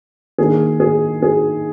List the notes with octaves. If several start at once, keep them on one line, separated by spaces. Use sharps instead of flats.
D#3 A#3 D4 G#4
G#4
G#4